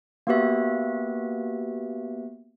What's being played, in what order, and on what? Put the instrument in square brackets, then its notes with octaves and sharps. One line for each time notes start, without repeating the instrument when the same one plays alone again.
[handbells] A#3 B3 F#4 G4 B4 E5